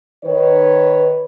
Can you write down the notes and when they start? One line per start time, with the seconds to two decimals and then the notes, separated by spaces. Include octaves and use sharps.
0.24 D#3 B4 C#5